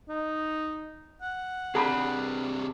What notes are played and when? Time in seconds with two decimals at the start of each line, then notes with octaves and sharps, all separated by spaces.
0.09 D#4
1.22 F#5
1.75 C3 D4 G#4 A#5 B5